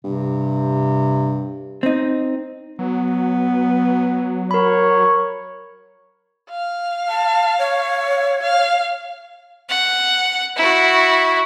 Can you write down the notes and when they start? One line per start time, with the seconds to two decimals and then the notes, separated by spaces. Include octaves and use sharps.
0.04 G2 C3
1.83 C4 D#4
2.79 F#3 B3
4.51 A#4 C#5 B5
6.50 F5
7.09 A5
7.59 C#5
8.41 F5
9.69 F#5
10.56 E4 F#4